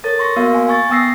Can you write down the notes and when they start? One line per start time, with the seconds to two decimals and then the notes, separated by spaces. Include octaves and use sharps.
0.04 A4 A#4 C#5 A6
0.19 C6 C#6 A#6
0.36 A#3 B3 F#4 A#4 F5
0.54 G#5
0.68 G#5 C#6 A6
0.89 B3 G5 D#6 E6 A#6 C7